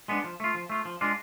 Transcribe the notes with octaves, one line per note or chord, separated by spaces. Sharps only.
G#3 B3 D4
F3
A3 F4
F3
A3 F4
F3
G#3 D4 F4